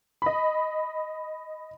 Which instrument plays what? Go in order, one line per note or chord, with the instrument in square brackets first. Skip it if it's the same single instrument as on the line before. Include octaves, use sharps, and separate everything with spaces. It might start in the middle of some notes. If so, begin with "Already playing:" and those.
[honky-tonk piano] D#5 B5